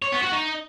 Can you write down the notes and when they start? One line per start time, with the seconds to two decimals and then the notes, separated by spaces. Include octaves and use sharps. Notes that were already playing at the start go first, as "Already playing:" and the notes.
0.02 C#5
0.12 B3
0.22 F#4
0.32 D#4